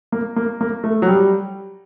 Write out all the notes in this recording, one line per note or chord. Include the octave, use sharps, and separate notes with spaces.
A#3
A#3
A#3
A3
F#3
G3